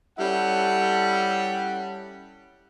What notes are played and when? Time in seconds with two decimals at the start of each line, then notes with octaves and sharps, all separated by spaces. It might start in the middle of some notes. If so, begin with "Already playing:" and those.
0.18 G3 C#4 E4 A4 F#5